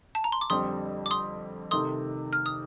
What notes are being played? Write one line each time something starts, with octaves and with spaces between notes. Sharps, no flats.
A5
A#5
C6
D6
F2 D3 G3 C4 C6 D#6
D6
C6 D#6
C3 D#3 A3 C6 D#6
F6
D#6